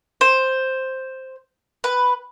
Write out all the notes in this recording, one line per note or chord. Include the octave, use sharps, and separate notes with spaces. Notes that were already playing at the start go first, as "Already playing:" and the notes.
C5
B4